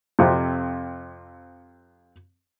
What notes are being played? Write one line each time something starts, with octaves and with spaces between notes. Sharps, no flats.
F2 C3